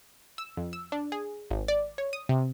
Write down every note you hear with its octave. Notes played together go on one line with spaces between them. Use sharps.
E6
F2
E6
D4
G#4
G#1
D5
C#5
D#6
C3